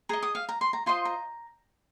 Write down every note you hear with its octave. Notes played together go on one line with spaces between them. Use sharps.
G#4 D#5 A#5
D#6
F5
A#5
C6
A#5
F4 C5 D#5 C6
A#5